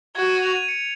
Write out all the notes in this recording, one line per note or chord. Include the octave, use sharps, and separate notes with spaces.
F#4 G#6
D#7
F7
D#7
C#7